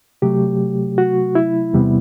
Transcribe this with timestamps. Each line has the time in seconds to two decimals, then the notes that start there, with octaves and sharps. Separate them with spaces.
0.22 C3 F#3 A3 G4
0.98 F#4
1.35 E4
1.74 E2 C3 G3 B3